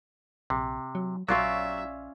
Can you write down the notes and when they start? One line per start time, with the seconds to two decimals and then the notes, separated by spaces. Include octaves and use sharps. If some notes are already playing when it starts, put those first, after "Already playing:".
0.50 A#1 C3
0.95 F#3
1.28 A#1 F#3 C#4 F4 D5 E5